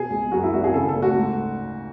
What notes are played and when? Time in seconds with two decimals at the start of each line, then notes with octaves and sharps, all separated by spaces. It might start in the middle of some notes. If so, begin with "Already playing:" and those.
Already playing: B2 G#4
0.10 C#2
0.32 F#2 F#4
0.43 E4
0.53 G#1 F#4
0.64 G#4
0.74 C#3 A4
0.89 A4
0.95 D2
1.02 F#4
1.17 G#2